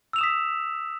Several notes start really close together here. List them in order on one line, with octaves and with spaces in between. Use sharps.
E6 F7 E7 D#6 B6